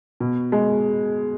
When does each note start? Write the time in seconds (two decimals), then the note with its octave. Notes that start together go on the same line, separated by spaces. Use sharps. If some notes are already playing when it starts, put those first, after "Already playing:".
0.20 B2
0.52 G#3